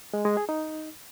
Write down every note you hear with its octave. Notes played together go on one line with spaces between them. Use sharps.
G#3
G#3
G#4
D#4